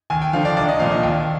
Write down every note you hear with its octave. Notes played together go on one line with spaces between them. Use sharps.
D#2 G#5
G5
D3 F3 F5
D5
C2 D5
D#5
A#2 F3 F5
D#5
D#2 G5